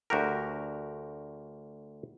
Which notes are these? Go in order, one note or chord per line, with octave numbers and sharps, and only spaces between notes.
D2 F#4 G4 A#4